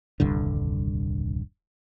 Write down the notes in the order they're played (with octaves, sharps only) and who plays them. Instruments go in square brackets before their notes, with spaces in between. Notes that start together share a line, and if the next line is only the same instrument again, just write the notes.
[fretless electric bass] D#1 C2 G2 D3